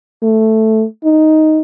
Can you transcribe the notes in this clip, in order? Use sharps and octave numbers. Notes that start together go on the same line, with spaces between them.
A3
D#4